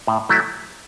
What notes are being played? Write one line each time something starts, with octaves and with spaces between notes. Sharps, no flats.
A2
F#3 A3 E4